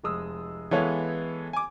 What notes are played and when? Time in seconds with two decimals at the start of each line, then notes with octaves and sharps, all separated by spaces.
0.04 F1 G#3 D#6 E6
0.71 E3 G#3 B3 A4 C#5 F5
1.53 G#5 D6